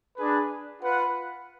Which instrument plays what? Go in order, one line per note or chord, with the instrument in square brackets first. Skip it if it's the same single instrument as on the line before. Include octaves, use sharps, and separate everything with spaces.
[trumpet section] D4 G#4 B4
F4 B4 F#5